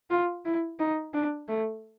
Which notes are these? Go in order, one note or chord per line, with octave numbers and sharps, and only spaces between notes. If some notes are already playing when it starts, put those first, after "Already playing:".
F4
E4
D#4
D4
A3